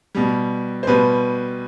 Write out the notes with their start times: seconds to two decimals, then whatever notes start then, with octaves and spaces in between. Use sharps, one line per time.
0.15 B2 G3
0.83 C5
0.87 B2 G3 B4